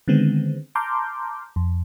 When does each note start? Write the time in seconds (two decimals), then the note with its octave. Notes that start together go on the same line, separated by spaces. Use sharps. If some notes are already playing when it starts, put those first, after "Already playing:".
0.08 D3 D#3 G#3 B3 C4
0.75 A5 A#5 C6 D6 F6 G6
1.56 F2